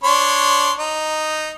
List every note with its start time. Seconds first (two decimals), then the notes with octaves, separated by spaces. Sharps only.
0.04 D4 C#5 C6
0.79 D#4